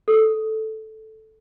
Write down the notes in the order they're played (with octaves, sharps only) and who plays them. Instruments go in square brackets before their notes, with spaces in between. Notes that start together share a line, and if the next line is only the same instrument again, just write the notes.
[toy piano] A4